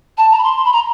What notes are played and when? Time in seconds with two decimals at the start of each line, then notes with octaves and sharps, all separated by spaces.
0.18 A5
0.31 A#5
0.38 B5
0.43 C6
0.57 C6
0.65 B5
0.73 A#5